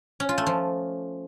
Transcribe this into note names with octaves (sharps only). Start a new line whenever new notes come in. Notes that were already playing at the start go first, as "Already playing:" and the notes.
C#4
F4
A3
F3